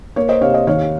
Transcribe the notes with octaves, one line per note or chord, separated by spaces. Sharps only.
A#3 A#4 C#5
C5 D#5
C3 C#5 F5
C5 D#5
D#2 C#5 F5